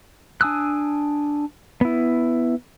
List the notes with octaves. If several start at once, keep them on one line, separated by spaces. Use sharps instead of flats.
D4 G#5 D#6 E6 F#6
B3 E4